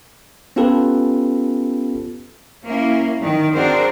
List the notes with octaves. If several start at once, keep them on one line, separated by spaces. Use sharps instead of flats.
B3 C#4 F4 G4 A4 B4
A#3 C#4 E4
D#3
C4 D4 F#4 G#4 A#4 C5